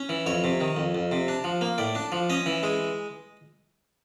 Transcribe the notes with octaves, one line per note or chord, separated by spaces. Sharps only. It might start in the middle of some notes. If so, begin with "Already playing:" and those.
Already playing: C#4
E3
F2 C#5
C3
D#3
F2
F2
C3
D4
F3
A#3
A2 D5
D4
F3
C#4 D#5
E3
G#3